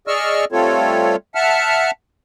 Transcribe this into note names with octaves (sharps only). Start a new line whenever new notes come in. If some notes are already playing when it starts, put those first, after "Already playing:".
G#4 D5 D#5 C#6 E6 F6
G3 A3 C4 F4 A4 C#5
E5 F#5 A5 F6